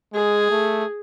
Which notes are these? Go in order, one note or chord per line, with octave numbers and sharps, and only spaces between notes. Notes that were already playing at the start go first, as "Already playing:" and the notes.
G#3 G#4
A3